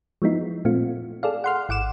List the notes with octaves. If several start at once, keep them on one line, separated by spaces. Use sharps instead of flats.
F3 G#3 B3 D#4 E4
A#2 A3 C4 F4
G#4 A4 D5 F5
F#5 C6 F6
G#1 F#5 D6 E7